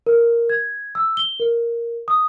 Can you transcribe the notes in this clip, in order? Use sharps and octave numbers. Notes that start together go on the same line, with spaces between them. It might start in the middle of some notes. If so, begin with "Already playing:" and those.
A#4
G#6
E6
G7
A#4
D#6